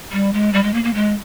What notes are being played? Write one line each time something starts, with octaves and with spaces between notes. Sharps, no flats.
G3
G#3
G3
G#3
A#3
A#3
G#3